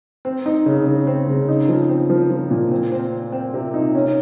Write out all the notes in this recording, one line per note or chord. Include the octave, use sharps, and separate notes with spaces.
C4
D#4
C#3
C#3
C4
C#3
D#4
F3
C4
F3
F3
A#2
C4
C4
C4
C4
C3
D#4
C#4